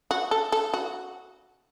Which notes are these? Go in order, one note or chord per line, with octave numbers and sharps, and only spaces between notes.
F#4
A4
A4
F#4